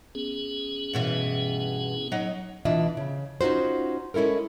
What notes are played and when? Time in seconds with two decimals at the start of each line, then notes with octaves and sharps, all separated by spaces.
0.15 B3 C#4 G#4
0.93 G2 B2 E3
2.12 F#3 D#4 D#5
2.65 B2 E3 D4 F4 D#5 E5
2.97 C#3
3.41 C#4 D#4 F4 F#4 C5
4.14 G#3 C#4 E4 A4 A#4